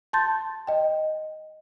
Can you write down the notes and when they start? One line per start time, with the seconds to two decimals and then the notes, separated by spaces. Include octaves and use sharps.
0.13 A5 C6 G6 A6
0.67 D#5 G5